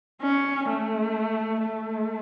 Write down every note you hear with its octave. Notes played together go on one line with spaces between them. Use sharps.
C#4
A3
A3